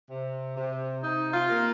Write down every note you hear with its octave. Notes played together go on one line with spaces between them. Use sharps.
C3
C3
C3 D#4
F4
A#3